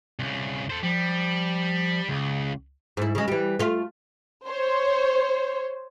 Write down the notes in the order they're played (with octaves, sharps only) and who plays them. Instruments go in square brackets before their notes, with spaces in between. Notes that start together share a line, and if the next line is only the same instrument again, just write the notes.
[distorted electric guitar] C2 C#3
A4 C5
[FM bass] F3 [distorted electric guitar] G3
[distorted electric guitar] C#2 [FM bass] C#3
[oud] G#2 E4
C#3 G#3
E3 G3
A3 F4
[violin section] C5 C#5